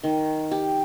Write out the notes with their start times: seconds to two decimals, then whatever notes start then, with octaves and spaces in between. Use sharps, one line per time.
0.03 D#3
0.51 G4